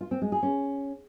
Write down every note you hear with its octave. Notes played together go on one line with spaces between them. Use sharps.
F4
C4
G#3
G#4
C#4